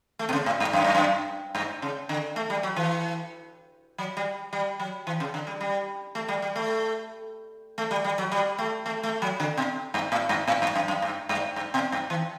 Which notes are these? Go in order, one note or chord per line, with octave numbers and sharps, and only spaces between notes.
A3
B2
C#3
A2
G2
F#2
G2
F#2
G2
C#3
D3
A3
G3
F#3
E3
F#3
G3
G3
F#3
E3
C#3
D3
G3
G3
A3
G3
G3
A3
A3
G3
G3
F#3
G3
A3
A3
A3
F#3
D3
B2
G2
A2
G2
A2
G2
F#2
F#2
G2
G2
G2
B2
G2
E3